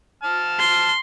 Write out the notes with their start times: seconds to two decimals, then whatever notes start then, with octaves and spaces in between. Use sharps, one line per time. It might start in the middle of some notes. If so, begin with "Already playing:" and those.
0.23 A5 F6
0.60 C6